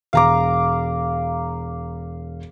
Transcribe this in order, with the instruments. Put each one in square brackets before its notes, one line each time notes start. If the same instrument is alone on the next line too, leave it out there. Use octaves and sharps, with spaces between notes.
[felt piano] E1 [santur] F5 A#5 D6